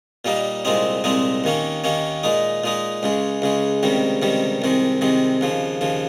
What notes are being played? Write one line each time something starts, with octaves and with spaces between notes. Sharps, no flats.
A#2 G3 A#3 D#4
C2 A#2 G#3 C4 D#4
C2 A#2 G#3 C4 D#4
D#2 D#3 A#3 C#4
D#2 D#3 A#3 C#4
A#2 G#3 D#4
A#2 G#3 D#4
C#2 C#3 G#3
C#2 C#3 G#3
C#2 C3 D#3 G3
C#2 C3 D#3 G3
C2 C3 D#3 G#3
C2 C3 D#3 G#3
D#2 C#3 F3
D#2 C#3 F3